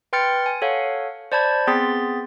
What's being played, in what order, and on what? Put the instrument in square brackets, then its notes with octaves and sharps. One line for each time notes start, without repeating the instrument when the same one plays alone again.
[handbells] B4 G5 C6 F6 A6 C#7
G#5
A4 C#5 F5 F#5
C5 D5 A5 B5 G#6
B3 C4 G#4 C6 A6 B6